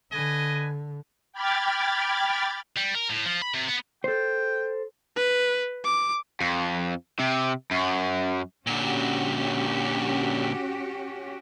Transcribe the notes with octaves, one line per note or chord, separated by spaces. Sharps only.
D3 B4 D#5 G#5
G5 B5 D6 F6 G#6 A6
G3
A#4
A2
F3
B5
C3
B3
A4 C5 G5
B4
D6
F2
C3
F#2
A#2 D3 C#4 F#4 G4